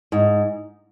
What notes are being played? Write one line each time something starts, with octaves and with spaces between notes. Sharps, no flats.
G#2